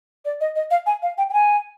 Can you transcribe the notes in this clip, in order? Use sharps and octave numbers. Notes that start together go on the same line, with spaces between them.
D5
D#5
D#5
F5
G#5
F5
G5
G5
G#5